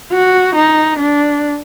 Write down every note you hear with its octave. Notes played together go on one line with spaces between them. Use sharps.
F#4
D#4
D4